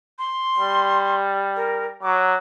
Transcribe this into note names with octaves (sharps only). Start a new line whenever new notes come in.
C6
G3
A#4
F#3 D6